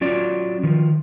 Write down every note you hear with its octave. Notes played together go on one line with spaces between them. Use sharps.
F#3 C#4 F4 D5
D#3 F3